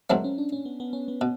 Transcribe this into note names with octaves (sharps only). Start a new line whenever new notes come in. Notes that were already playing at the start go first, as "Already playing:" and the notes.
G#2 D#3 F#3 A3 C4
C#4
D4
C#4
B3
B3
C#4
B3
B2